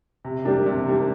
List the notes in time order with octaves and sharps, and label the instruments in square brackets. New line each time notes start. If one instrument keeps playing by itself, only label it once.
[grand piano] C3
[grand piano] G3 A#3 D4 [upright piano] G4
[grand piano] C3
G3 A#3 D4